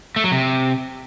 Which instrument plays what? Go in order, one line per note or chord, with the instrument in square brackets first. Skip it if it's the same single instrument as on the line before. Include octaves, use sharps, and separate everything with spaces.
[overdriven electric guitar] A3
F#3
C3